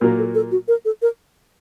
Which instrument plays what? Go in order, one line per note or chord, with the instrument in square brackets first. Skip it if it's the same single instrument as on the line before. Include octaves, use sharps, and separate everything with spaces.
[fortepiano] A#2 F#3 A#3 [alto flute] A#4
[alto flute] A4
A4
F#4
A#4
A4
A#4